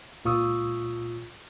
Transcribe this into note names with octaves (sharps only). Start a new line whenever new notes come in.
C#2 A#2 F4 C#6 D#6 E6